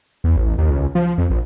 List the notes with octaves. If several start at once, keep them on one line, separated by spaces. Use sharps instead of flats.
E2
A1
D#2
C#2
F3
F2
A#1